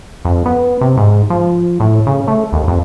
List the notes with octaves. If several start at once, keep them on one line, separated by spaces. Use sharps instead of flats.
F2
B3
C3
G#2
F3
A2
C#3
A3
D#2
F2